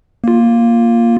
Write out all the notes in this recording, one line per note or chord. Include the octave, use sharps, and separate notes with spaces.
A#3 F4